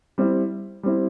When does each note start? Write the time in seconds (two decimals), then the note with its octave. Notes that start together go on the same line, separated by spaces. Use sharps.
0.18 G3 C4 E4
0.83 G3 C4 E4